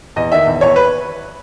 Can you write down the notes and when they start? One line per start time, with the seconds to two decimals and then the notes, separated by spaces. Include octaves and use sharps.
0.16 E2 D#5
0.32 D#3 E5
0.47 E2
0.61 E2 C#5
0.76 B4